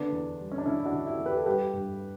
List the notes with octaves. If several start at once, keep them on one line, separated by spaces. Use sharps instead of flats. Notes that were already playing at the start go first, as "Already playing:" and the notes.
Already playing: D3 B3 D4
E2
G3
C#4
D4
D3 C#4 E4
E4
D4 F#4
D3
E4 G4
E2
G4 B4
A4
G3 G4 B4
G2